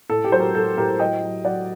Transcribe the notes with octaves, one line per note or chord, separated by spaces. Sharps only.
A2 A4
G4
F#3 C5
G4 A#4
F#3 A4
A2 G4 A#4
F#3 D#5 G5
F#3
F#3 D5 F#5